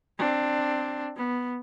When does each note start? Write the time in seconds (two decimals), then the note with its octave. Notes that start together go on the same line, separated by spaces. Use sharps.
0.19 C4 D4
1.17 B3